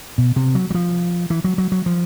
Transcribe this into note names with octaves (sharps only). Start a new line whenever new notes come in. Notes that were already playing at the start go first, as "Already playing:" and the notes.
B2
C3
F#3
F#3
F3
E3
F#3
F#3
F#3
F3